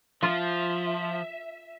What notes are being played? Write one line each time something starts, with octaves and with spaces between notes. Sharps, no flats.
F3 F4 E5